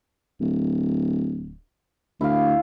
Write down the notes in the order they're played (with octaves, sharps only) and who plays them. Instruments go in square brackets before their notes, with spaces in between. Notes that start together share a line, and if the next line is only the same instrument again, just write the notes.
[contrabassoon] D1
[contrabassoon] D2 [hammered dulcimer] E4 F5